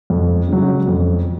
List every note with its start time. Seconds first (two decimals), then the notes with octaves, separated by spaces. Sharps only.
0.10 F2
0.48 C#3 F#3
0.87 F2